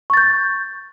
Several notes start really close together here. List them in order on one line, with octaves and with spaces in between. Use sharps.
C#6 A6 G6